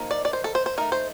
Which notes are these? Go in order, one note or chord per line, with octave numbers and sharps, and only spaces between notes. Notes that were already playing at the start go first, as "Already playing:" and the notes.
Already playing: F3 A#3 D#4
D5
D5
C5
A4
C5
C5
A3 D#4 A#4
C5